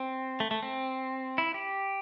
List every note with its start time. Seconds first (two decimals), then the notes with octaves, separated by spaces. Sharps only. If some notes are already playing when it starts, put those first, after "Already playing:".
Already playing: C4
0.40 A3
0.51 A3
0.63 C4
1.38 E4
1.54 G4